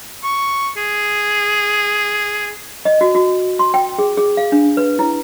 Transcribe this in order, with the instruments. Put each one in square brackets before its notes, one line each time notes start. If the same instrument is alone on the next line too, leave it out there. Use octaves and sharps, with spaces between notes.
[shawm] C#6
G#4
[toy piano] D#5
F#4
F#4
C6
G5
G#4
G#4
F5
D4
B4
E4